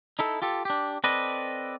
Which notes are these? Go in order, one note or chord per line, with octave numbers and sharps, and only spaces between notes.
D#4 E4 A4
F4 G4 A4
D4 G4
C4 A4 B4 D5 D#5